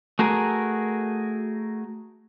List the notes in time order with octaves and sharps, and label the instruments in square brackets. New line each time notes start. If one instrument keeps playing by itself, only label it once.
[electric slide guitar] A3 F#4 G#4 A#4